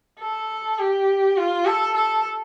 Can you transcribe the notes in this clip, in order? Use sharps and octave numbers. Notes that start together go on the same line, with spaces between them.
A4
G4
F4
A4
A4